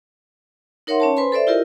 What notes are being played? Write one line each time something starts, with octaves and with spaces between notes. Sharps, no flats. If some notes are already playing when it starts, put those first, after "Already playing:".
D#4 A#4 C#5 E5 F#5 C6
C#4 C#5 A5
B4 C5 G#5 B5 C6
A4 C5 D5 E5
E4 F4 G4 A#4 D#5